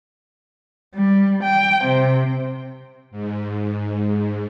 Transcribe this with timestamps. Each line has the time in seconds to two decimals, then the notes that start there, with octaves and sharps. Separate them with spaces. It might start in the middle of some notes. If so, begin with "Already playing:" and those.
0.95 G3
1.44 G5
1.84 C3
3.11 G#2